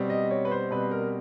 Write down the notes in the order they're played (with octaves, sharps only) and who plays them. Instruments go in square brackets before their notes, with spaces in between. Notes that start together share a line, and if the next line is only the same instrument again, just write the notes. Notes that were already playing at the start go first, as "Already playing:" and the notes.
Already playing: [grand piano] B2 G3 C4
D#5
C#5
B4
C5
B2 G3 C4 B4
A#4